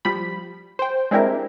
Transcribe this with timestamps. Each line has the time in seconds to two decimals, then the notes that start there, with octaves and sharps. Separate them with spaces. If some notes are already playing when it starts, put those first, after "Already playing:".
0.05 F3 G3 B5
0.79 C5 G5
1.11 G#3 C4 D4 E4 G4 A#4